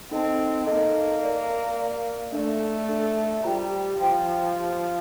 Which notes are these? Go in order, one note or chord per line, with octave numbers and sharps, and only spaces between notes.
C4 D#4 A4 D#5 A5
A#3 D#4 A4 D#5 A5
A#4 D5 F5
A#4 D5 F5
A3 D4 A4 D5
D4 A4 D5
G3 F4 C5 G5 A#5
F3 F4 C5 G5 A#5
G4 C5 F5